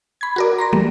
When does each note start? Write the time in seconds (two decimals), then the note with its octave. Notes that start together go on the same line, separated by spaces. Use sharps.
0.21 B5 G#6
0.36 F#4 A#4 D5
0.58 A#5 C6 A#6
0.73 E3 G3 A3 A#3